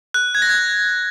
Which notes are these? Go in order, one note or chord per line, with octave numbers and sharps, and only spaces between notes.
F#6
G#6
A#6
G#6